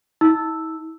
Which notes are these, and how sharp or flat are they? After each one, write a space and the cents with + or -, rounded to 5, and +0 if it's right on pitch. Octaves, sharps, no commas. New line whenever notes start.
E4 -45 E6 +0